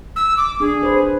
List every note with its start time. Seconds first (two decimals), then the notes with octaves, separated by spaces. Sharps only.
0.16 E6
0.37 D6
0.60 D4 G#4
0.83 B4 C5